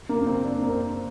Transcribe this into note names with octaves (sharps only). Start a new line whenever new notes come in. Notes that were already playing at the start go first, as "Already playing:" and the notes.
A#3
A#3
C4
D4
A#3
C4